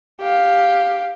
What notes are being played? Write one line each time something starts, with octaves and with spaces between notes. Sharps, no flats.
G4 F5